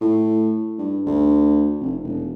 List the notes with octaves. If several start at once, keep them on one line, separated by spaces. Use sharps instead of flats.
A2
G2
D2
F1
E1